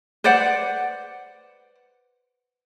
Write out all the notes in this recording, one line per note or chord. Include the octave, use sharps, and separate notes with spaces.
B4 C5 D5 F#5